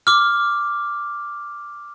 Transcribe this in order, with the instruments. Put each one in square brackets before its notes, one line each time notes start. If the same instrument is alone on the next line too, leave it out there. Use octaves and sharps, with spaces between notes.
[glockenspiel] D6 F6